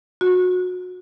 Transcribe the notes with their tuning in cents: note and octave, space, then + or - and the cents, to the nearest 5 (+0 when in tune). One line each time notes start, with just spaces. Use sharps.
F#4 -25